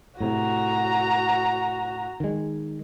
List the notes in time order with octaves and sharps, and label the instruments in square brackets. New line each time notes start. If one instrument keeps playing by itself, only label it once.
[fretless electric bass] A2 C3 [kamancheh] F#4 A#5
[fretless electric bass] D#3 G#3